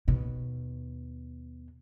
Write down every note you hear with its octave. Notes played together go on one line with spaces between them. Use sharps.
D#2 B2